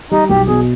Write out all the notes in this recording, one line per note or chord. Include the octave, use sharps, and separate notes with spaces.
G3 D#4
B1 G4
B2 G#4